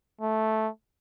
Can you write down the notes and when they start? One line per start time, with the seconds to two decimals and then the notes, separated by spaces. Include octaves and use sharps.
0.21 A3